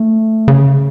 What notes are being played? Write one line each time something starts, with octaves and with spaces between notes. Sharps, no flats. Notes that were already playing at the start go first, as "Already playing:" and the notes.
Already playing: A3
C#3